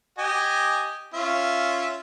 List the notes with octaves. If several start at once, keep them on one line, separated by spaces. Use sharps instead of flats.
G4 D#5 G#5
C#4 F4 E5